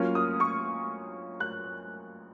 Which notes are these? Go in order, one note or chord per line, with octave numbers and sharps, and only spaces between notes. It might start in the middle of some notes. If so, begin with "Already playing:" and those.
Already playing: F#3 A#3 C#4 F4 F6
D#6
C#6
F#6